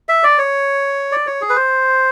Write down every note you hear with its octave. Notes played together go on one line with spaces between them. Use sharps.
E5
D5
C#5
D5
C#5
G#4
B4
C5